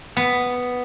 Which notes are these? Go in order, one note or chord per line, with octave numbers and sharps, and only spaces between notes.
B3